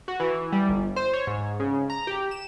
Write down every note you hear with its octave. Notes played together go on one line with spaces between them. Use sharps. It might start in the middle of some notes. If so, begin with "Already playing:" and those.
F#4
E3
G3
G1
C5
C#5
G#2
C#3
A#5
G4
E7